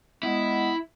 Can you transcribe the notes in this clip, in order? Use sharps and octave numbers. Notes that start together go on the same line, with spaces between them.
G#3 B3 E4